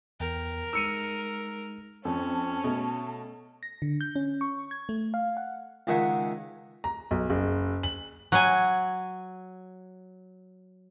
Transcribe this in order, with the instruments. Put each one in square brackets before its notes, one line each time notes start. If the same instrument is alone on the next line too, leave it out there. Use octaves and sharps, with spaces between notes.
[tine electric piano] E2 B3 G5 [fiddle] A#4
[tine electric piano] G#3 D#4 [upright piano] E6 C#7 D#7
[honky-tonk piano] F2 [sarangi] C#4 [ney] A5
[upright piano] B2 [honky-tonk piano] A3
[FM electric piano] A#6
D3
G6
C#4
C#6
G#6
A3
F5
F#5
[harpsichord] C#2 D#3 G#4 E5 F#5
[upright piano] A#5
B1
F#1
F#7
[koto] F#3 G#5